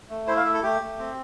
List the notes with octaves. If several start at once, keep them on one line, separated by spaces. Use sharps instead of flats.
A3
E4 C5
F5
A3 E5
A4
A3 G4
A3
C4